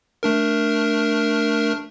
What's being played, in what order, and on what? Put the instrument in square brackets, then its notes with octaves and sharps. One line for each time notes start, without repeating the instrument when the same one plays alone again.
[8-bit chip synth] A3 D4 A#4